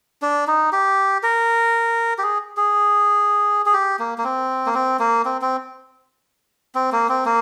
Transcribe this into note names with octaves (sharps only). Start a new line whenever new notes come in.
D4
D#4
G4
A#4
G4
G#4
G#4
G#4
G4
A#3
A#3
C4
A#3
C4
A#3
C4
C4
C4
A#3
C4
A#3